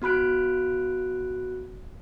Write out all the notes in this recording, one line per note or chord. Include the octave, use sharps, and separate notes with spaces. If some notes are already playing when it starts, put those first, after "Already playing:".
B3 F#4 B5 F#6 D7